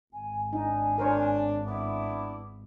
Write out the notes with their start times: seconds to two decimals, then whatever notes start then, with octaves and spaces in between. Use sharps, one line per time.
0.13 G#1 G#5
0.53 D4 D#4 G#5
0.98 D4 A#4 C5 C#5
1.66 B3 D4 E4 D6